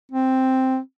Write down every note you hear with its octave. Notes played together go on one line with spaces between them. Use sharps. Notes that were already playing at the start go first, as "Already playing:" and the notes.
C4